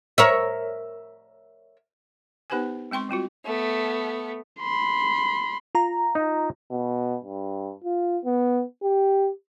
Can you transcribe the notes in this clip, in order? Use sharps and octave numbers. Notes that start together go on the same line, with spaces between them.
A#4 C#5 E5
B3 D#4 G4 B4 C5 G#5
G#3 C4 G5 C6 C#6
G3 C4 F4 F#4
A3 B3
B5 C6
F4 A#5
D#4
B2
G2
F4
B3
G4